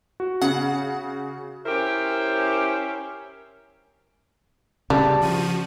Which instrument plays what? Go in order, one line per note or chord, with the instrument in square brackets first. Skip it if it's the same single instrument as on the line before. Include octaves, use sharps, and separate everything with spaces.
[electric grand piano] F#4
[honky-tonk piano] C#3 [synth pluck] F#5
[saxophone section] C#4 E4 G4 A#4 C5
[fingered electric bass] C#3 [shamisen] G3 [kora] D4
[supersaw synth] F3 F#4 D#7